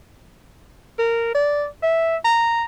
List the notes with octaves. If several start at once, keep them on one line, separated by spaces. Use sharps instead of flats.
A#4
D5
E5
A#5